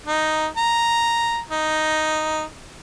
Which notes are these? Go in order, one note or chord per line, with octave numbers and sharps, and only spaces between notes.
D#4
A#5
D#4